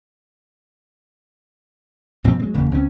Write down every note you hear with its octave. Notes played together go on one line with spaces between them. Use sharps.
G2 B2 F3 C4
F#3 G#3 C4
F#1 E2 C#3 A#3
C#2 C4 C#4